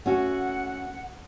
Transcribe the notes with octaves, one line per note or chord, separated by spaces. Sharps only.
A3 C#4 F#4 F#5